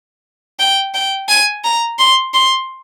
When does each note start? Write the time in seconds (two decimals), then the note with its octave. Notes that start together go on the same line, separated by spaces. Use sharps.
0.59 G5
0.94 G5
1.29 G#5
1.64 A#5
1.99 C6
2.34 C6